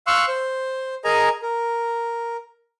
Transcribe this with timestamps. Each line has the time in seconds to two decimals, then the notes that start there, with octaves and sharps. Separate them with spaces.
0.07 F5 C6 C#6 E6 F#6
0.28 C5
1.04 G#4 A#4 D#5 G#5 A#5
1.42 A#4